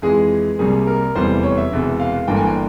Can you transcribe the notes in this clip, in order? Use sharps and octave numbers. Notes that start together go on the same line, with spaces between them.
F2 E3 G#3 G#4
C2 C3 G3 A#3 G#4
A#4
F1 E2 C3 E3 G3 C5
C#5
E5
E1 E2 C3
F5
G1 G2 E3 A#3 G5
G#5
G5